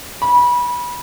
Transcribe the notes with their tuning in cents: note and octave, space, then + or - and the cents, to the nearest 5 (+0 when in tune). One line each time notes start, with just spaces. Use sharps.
B5 -20